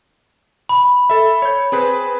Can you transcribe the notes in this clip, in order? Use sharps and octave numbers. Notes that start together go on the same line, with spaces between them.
B5
A4 E5
C#5 G6
C4 G#4 B4